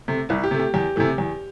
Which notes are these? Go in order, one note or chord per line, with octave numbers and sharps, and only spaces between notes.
C3 A3
C2 E4
G4
C3 A3
G4
E2 G4
C3 E3 A3
E2